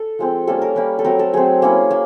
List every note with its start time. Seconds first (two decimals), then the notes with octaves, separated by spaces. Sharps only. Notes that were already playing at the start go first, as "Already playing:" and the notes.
Already playing: A4
0.19 F3 G#3 C4
0.47 G3 A#3 C#4 A4
0.62 A#4
0.75 G3 A#3 C#4 B4
0.99 A4
1.04 F#3 A3 C4 A#4
1.19 A4
1.33 F#3 A3 C4 G#4
1.62 A#3 C#4 E4
1.91 A#3